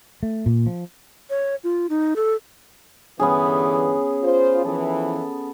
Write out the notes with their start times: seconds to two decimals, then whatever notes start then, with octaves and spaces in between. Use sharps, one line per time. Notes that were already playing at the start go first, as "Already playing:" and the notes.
0.23 A3
0.46 A#2
0.66 F3
1.30 C#5
1.64 F4
1.90 D#4
2.16 A4
3.20 G2 D3 E3 B3 C#4 G#4
4.23 F4 C5
4.65 E3 F3 A4